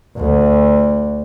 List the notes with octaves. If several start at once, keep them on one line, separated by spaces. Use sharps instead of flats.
D2